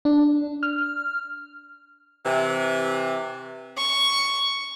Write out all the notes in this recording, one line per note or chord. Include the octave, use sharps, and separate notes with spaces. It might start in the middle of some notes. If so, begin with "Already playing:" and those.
D4
F6
C3 E3
C#6